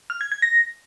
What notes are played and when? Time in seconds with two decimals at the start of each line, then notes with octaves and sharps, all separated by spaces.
0.10 F6
0.21 G#6
0.32 G#6
0.42 A#6